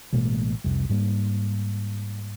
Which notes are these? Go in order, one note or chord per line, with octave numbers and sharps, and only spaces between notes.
A1 B2 G#3 A#3
F1 C2 C3
G#2 G3 A3 A#3